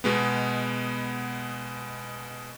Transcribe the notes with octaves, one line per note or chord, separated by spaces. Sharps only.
B2 G#3 B3